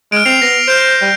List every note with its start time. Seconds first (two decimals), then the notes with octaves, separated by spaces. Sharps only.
0.12 G#3 F6 D7
0.26 C4 C7 F7
0.42 B3 A#6
0.68 C5 F6 G6 D7
1.02 G3